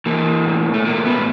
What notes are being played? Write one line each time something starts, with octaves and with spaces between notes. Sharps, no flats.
E3 A#3
A2
A3
A2 A#3
A3 B3